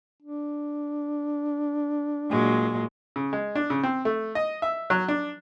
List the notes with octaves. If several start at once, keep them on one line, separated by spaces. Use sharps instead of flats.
D4
A#2 F#3 G#3
C#3
G#3
D4
C#3
C4
A3
D#5
E5
F#3
D4